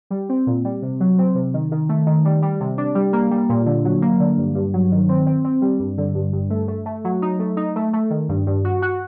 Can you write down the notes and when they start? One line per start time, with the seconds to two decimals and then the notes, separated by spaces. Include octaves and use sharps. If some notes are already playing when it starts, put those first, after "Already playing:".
0.10 G3
0.29 C4
0.47 A#2
0.65 G3
0.82 C3
1.00 F#3
1.18 C4
1.35 C3
1.54 D#3
1.72 D#3
1.89 A3
2.06 D#3
2.25 G3
2.42 G3
2.60 C3
2.78 D4
2.95 G3
3.13 A#3
3.31 G3
3.49 A#2
3.66 D3
3.85 F#3
4.02 A#3
4.20 D3
4.37 G2
4.55 G2
4.73 F#3
4.91 D#3
5.09 C4
5.27 C4
5.44 C4
5.61 G3
5.79 G2
5.98 D3
6.15 G2
6.33 G2
6.50 A3
6.68 A3
6.86 A3
7.04 F#3
7.22 D#4
7.39 A3
7.57 D#4
7.76 A3
7.93 A3
8.10 D#3
8.29 G2
8.47 G2
8.64 F#4
8.82 F#4